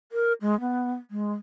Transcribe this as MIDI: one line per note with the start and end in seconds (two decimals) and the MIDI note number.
0.12 0.33 70
0.41 0.58 56
0.60 0.92 59
1.11 1.33 56